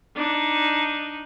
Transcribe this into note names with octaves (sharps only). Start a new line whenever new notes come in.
D4 D#4